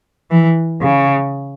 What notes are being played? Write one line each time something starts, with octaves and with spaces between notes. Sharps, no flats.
E3
C#3